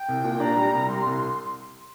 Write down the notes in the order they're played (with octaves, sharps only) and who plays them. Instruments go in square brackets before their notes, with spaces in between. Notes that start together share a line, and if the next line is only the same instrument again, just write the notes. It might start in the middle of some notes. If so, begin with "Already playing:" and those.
Already playing: [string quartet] G5
[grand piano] C2
A#2
[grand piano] D4 [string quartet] A#5
[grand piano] G3
C2
[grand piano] G3 [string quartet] C6
[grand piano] C2